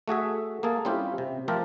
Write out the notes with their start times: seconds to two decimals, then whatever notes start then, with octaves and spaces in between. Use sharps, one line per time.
0.08 A3 F#4 G#4 E5
0.63 A#3 G#4 A4
0.85 G3 C4 C#4 E4 F4 G4
1.18 C3
1.48 F3 A3 C4 G4 A4 A#4